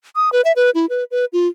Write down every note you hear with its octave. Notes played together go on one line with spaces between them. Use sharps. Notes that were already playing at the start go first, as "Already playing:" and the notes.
D#6
B4
E5
B4
E4
B4
B4
F4